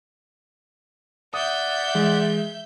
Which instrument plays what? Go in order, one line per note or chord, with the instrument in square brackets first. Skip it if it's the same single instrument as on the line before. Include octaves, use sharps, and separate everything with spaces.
[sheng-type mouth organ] D5 F#5 [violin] E5 G6 [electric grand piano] D#6
[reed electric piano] E3 [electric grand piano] G#3